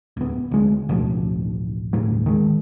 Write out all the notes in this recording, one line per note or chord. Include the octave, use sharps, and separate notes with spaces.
D1 B3
D2 G#3
A1 D2 B2 F3
G1 D#2 A2 G3
D#3 G#3